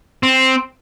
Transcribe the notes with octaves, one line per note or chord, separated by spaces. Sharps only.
C4